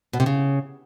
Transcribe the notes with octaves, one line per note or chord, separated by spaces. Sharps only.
B2
C3
C#3